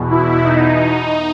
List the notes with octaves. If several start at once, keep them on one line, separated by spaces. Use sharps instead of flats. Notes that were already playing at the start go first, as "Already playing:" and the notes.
Already playing: E2 B2
E4
D#4